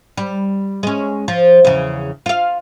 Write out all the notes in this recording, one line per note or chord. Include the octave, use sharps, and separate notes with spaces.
G3
G#3 C#4
F3
E2 C#3
F4 F5